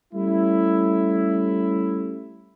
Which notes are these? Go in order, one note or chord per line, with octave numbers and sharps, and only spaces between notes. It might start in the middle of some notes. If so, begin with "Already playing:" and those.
G3 A3 C#4 E4